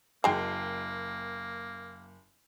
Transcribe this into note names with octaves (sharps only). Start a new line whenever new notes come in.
F#1 F#3 G#3 A#3 G5 C7